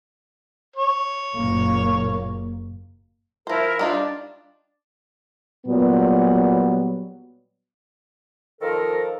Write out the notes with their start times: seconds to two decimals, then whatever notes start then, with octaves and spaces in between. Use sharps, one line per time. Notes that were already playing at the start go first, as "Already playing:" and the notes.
0.76 C#5
1.36 F#1 A#2 A#3
3.47 F3 E4 A#4 C5
3.79 G3 D4 D#4 F4
5.67 A#2 F#3 G3 B3
8.61 D#3 F3 A4 A#4